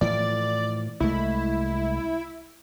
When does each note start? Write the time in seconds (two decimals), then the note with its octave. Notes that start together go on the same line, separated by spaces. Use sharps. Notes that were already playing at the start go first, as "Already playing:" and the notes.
0.01 A2 E3 F3 D5
1.00 C2 G#3 A3 E4